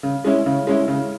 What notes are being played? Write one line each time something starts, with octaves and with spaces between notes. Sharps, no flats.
C#3
G#3 C#4 E4
C#3
G#3 C#4 E4
C#3